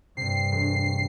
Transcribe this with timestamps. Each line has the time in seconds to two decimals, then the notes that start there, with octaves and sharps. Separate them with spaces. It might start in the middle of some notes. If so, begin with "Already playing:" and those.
0.17 G2 C3 C7
0.52 E1